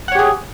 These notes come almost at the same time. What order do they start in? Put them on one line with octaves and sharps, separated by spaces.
F#5 C#5 G4 G#4